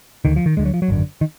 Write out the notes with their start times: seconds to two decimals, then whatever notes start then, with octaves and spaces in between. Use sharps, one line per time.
0.25 D2 D3 D#3
0.36 F3
0.46 D#3
0.57 D2 D3 G#3
0.65 F#3
0.74 F3
0.82 F#3
0.88 G#1 F#2 D3
1.21 D#3